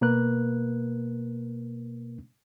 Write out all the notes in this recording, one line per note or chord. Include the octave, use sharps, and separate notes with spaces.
B2 A#3 A#4 B4 F#6